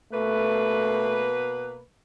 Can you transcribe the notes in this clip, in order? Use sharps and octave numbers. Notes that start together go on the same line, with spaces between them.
B2 A3 A#3 B4